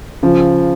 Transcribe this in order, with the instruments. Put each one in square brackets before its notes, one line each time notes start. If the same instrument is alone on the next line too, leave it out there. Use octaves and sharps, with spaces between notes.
[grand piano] C#3 F3